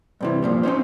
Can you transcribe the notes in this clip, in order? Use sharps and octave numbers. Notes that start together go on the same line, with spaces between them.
G2 C3 E3
G2 A#2 F3
C4 C#4 D#4 C5